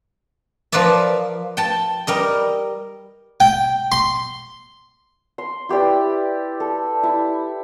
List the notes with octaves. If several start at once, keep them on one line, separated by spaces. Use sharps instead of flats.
F3 A#4 B4 D5 E5
G5 A5
G3 A#4 D#5
G5
C6
C6
E4 G4 B4 D5
A4
E4